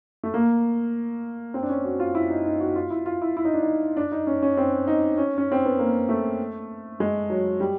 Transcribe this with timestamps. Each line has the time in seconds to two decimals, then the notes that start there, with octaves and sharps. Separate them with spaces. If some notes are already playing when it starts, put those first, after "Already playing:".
0.24 A3
0.34 A#3
1.54 C4
1.63 D4
1.70 C#4
1.84 F#4
2.00 F4
2.15 E4
2.30 D#4
2.45 D#4
2.60 F#4
2.76 F4
2.90 E4
3.06 F4
3.22 E4
3.37 E4
3.45 D#4
3.53 D4
3.63 D#4
3.97 D4
4.12 D#4
4.27 C#4
4.42 C#4
4.57 C4
4.87 D#4
5.18 C#4
5.38 C#4
5.52 C4
5.65 B3
5.79 A#3
6.09 A3
7.00 G#3
7.30 F#3
7.60 G3